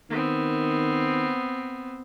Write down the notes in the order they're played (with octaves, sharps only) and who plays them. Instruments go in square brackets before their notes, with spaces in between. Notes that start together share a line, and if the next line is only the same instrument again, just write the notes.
[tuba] D#3 [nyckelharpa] B3 C4